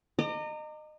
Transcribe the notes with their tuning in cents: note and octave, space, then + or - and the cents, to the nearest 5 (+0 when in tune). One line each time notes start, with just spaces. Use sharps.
D#5 -25 A#5 -30 D6 +25